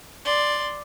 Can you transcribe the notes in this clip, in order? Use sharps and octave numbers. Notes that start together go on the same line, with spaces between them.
D5 C6